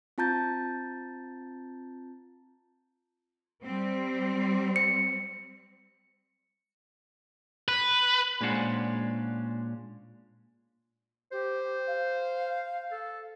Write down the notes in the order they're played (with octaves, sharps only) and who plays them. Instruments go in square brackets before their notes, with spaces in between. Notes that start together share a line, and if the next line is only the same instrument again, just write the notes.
[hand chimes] C4 F4 A5 A#5 G6 A6
[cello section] G3 C4
[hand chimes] C#7
[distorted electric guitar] B4
[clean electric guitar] A#2 G#3 C#4 D4 C5 F#5
[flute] G4 [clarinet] C5
[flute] F5
[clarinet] A4